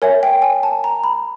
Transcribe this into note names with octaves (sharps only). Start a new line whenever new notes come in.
A#4 C#5 E5 G#5
G5
G#5
A5
A#5
B5